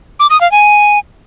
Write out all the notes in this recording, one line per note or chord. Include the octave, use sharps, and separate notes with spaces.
D6
D#6
F5
G#5